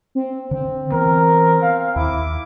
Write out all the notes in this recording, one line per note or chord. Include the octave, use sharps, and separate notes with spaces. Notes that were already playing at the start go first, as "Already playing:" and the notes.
C4
D3 C4
E3 B3 A#4
F5
D#2 E4 D6